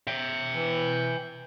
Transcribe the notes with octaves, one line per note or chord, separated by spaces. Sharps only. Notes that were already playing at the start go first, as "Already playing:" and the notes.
E5 G5
E3